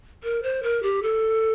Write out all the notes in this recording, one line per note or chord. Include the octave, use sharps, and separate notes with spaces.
A#4
C5
A#4
G4
A4